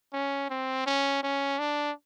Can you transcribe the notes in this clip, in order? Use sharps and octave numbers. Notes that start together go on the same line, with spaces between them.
C#4
C4
C#4
C#4
D4